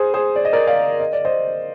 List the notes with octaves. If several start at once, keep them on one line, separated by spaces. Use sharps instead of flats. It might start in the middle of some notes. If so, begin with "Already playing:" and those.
Already playing: G#4 C5
G#4 C5
D5
D#5
A#4 D5
D5 F5
D#5
D5
C5 D#5